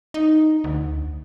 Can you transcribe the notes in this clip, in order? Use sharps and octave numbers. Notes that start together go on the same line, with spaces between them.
D#4
D2